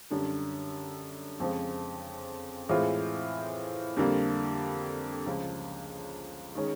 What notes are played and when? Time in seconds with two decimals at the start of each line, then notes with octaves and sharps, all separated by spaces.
0.10 F#2 D3 G3
1.40 F2 C#3 F3 G#3 C4
2.69 A2 E3 G#3 C4 F4
3.97 F2 D3 G3 A#3
5.26 C#2 C#3 F3
6.55 D#3 G#3 C#4